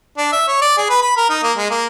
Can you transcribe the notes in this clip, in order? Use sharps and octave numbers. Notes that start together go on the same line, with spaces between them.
D4
E5
C#5
D5
G#4
B4
B5
A#4
D#4
A#3
G#3
A#3